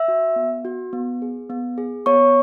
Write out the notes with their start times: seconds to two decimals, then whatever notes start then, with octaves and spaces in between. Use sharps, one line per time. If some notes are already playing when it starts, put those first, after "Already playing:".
Already playing: E5 E6
0.08 F#4
0.36 B3
0.65 F#4
0.93 B3
1.22 G#4
1.50 B3
1.78 G#4
2.06 B3 C#5 C#6